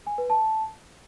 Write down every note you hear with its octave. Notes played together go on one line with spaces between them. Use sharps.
G#5
B4
A5